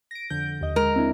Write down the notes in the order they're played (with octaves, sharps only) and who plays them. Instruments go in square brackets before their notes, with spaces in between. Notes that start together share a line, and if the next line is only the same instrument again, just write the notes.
[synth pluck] A#6 D7
F2 D3 G6
D#2 D#5
[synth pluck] G#3 [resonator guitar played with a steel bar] A#4
[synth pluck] C4 D4 E4